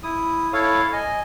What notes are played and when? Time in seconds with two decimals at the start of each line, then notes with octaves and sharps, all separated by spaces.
0.03 E4 D#6
0.53 E4 A4 C#5 F5
0.93 D#5 G#5